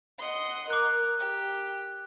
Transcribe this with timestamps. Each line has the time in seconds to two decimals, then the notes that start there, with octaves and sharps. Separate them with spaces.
0.19 D#5 F#5 C6
0.70 A#4 D6 F#6
1.20 G4